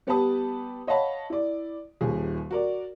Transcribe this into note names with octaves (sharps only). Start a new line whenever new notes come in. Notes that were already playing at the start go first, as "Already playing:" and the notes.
G3 B3 G4 B4 A5 D#6
C#5 D#5 F5 F#5 A5 B5
E4 D5
D#1 D#2 G#4
F#4 A#4 D5